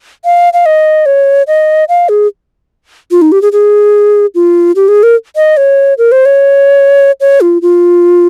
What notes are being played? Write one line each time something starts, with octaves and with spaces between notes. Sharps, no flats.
F5
F5
D#5
C#5
D#5
F5
G#4
F4
D#4
G4
G#4
G#4
F4
G4
G#4
A#4
D#5
C#5
A#4
C5
C#5
C#5
F4
F4